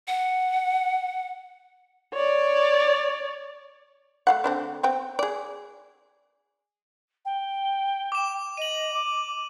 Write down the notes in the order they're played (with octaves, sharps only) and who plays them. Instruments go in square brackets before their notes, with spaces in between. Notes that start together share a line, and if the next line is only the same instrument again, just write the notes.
[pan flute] F#5
[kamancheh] C#5 D5
[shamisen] A3 F5 F#5
D3 C4 D4
B3 C4 G5
G#4 D5
[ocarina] G5
[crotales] D6 E7
[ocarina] D#5 [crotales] D#7 F#7
[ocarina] D6